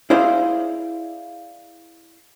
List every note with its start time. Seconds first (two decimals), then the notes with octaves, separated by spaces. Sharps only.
0.10 E4 G#4 C5 D5 F5